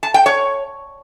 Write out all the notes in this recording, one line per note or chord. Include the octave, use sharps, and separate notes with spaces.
A5
G5
C#5